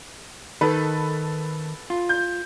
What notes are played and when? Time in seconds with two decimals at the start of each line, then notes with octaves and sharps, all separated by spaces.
0.61 D#3 D#4 A4 B4
1.90 F4
2.09 G6